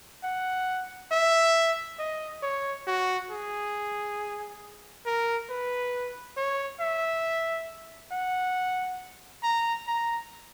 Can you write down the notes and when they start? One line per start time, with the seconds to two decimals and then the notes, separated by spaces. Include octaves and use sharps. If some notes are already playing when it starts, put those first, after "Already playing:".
0.24 F#5
1.11 E5
1.99 D#5
2.43 C#5
2.87 F#4
3.31 G#4
5.06 A#4
5.50 B4
6.37 C#5
6.80 E5
8.12 F#5
9.43 A#5
9.87 A#5